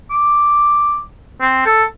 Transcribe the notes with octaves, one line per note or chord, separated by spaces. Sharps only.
D6
C4
A4